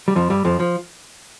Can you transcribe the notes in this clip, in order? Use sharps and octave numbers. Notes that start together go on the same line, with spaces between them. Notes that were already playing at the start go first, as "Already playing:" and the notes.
G3
F2 F3
G2 G3
F2 F3
F3